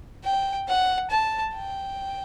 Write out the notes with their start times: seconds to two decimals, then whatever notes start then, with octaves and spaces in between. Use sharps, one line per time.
0.24 G5
0.68 F#5
1.10 A5
1.55 G5